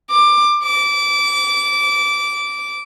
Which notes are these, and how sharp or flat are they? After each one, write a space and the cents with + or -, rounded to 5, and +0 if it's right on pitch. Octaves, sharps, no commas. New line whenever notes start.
D6 +20
D6 -20